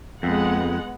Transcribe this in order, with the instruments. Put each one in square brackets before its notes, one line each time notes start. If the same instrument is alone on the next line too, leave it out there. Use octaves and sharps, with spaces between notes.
[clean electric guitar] F2 [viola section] G#3 B3 F#5